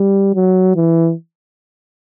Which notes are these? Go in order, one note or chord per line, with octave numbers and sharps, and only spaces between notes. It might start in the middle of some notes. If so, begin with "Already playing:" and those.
Already playing: G3
F#3
E3